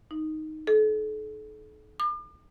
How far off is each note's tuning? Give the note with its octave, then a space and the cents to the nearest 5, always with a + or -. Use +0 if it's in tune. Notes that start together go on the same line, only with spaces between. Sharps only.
D#4 +0
A4 -40
D6 +40